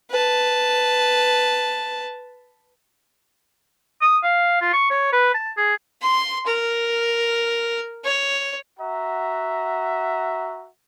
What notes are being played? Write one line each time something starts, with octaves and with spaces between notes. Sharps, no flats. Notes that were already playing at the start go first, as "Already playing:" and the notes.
B4 A5
D#6
F5
F4
C#6
C#5
B4
A5
G#4
C6
A#4
C#5
F#4 E5 F#5 A#5